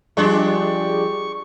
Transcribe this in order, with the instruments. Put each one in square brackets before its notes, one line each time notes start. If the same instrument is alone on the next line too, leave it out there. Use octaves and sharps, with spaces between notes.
[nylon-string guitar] F3 G3 D5 [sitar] G#3 D4 G4 [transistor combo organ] C#6